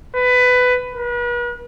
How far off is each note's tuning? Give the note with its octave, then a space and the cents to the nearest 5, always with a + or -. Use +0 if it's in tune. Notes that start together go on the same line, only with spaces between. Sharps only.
B4 +15
B4 -40